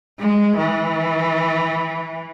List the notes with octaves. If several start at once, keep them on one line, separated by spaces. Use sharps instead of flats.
G#3
E3